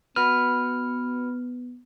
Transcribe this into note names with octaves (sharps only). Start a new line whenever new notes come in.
B3 F#4 B4 F6